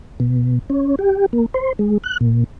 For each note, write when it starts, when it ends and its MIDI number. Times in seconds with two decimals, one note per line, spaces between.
0.20 0.59 47
0.70 0.95 61
0.99 1.26 67
1.33 1.46 58
1.54 1.73 72
1.79 1.98 56
2.04 2.18 90
2.21 2.44 46